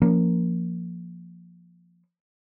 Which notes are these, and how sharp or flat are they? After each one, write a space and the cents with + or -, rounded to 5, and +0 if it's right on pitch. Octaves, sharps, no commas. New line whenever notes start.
F3 +0 A#3 +0 C#4 +35